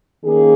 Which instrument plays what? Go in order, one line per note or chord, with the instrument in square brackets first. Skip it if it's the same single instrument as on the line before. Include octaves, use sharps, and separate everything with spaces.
[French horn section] D#3 A#3 C#4 G#4